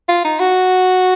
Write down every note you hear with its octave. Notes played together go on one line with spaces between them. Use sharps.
F4
D#4
F#4